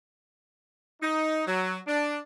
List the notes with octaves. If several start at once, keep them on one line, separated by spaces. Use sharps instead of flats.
D#4
F#3
D4